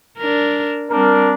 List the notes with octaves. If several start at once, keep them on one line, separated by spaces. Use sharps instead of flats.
D4 A#4
G3 C4 D4 A#4